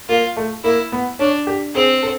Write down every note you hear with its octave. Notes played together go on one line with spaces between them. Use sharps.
A#3 F4
A3
A#3 E4
B3
C#4 D4
G4
C4 G#4
A4